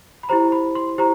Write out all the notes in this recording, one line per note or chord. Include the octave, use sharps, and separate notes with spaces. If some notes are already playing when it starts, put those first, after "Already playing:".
B5
E4 G4 C5 A#5
B5
C6
E4 G4 C5 A#5